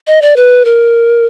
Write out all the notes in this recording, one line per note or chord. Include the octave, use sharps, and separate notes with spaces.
D#5
D5
B4
A#4